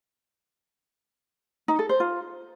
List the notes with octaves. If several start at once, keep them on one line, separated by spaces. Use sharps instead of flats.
D#4
A4
C5
F4